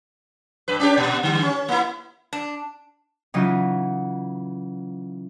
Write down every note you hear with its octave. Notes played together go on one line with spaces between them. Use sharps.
G2 B4
C#4 D4 G4
A#2
D3 G3
C#4
A#3 E4
D4
C#3 E3 F#3 D#4 F4